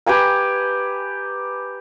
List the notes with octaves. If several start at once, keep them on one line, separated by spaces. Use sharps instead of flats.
G4 B4 G#5 A#5